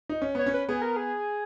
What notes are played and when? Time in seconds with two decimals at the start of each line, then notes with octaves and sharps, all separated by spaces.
0.09 D#4
0.22 C#4
0.35 B3 C#5
0.46 C#4
0.54 B4
0.69 B3 G#4
0.82 A#4
0.96 G#4